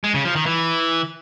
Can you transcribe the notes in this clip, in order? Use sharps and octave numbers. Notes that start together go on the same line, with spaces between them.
G#3
C#3
F3
D#3
E3